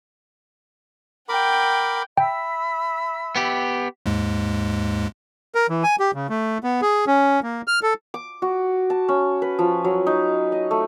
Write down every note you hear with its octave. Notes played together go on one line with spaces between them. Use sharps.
A#4 F#5 G5 B5 D6
E5 G5 B5 E6
B3 G4
D#2 G#2 G#3
A#4
E3
G#5
G4
C#3
A3
B3
G#4
C#4
A#3
F6
A4
D6
F#4
A5
C#4
B4
F3
F#3
D#4
D#5
A3